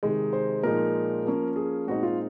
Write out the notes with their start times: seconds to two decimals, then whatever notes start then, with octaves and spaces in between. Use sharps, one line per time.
0.03 C3 D#3 G#3 D#4
0.33 C5
0.63 A#2 F3 G#3 D#4 A#4
1.25 F3 A#3 C#4
1.56 G#4
1.87 A#2 G#3 C4 D#4 F#4
2.03 F4